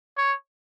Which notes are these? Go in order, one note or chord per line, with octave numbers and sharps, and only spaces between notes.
C#5